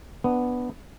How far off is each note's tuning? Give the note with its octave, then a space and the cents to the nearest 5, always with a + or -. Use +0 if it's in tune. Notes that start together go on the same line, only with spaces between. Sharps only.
B3 +0 D4 +0